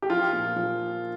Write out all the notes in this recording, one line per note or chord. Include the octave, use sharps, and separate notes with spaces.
G4
F3 F4
A#2
F3